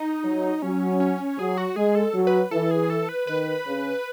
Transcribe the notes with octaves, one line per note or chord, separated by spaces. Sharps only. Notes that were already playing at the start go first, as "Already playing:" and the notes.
Already playing: D#4
F#3
F#3 C#4
C#4
F#3 G#4
F#4
G#3 G#4
A4
F#3
B4
E3 A4
G#4
A4
B4
D#3 B4
C#3